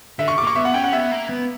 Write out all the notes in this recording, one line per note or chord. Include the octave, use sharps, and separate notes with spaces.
D3 E5
C#6
D6
A#3 C#6
B3 E5
F#5
C#4 G5
F#5
B3 E5
A#3
B3